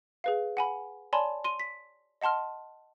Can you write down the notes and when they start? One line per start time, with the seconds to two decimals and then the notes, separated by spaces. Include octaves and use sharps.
0.24 G#4 B4 F5
0.57 F#5 G#5 B5
1.13 C#5 D5 G#5 A5 B5 C6
1.44 C6 D#7
1.60 B6
2.21 D#5 F#5 A5 C6 F6